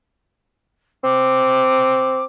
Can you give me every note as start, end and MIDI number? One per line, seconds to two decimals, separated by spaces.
1.04 2.24 60
1.04 2.24 86